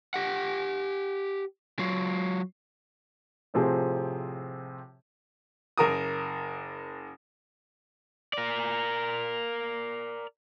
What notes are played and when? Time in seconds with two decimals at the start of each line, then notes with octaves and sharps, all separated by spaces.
0.14 G4 F#5
1.79 F#3 F4
3.54 A2 C3 F3 C4 G#4
5.78 F#1 A#4 D#6
8.33 A#4 D5